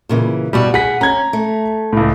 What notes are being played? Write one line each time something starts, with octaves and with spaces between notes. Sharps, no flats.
A#2 C#3 E3
G2 B2 G3 F#4
G#4 F#5 B6
C#4 A#5 G#6
A3
C#2 A2